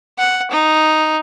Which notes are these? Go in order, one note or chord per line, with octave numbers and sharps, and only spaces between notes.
F#5
D#4